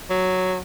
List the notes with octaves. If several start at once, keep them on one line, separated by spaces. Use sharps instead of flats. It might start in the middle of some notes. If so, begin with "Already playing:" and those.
F#3